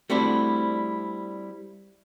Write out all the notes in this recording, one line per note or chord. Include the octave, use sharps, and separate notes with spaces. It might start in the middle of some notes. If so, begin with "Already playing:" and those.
G3 A3 C4 D4 E4 F#4